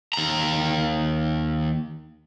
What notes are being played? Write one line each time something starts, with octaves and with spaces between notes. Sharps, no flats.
D#2 A#5